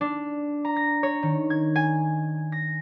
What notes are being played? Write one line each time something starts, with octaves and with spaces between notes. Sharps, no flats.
D4
A#5
A#6
C#5
D#3
G#6
G#5
A#6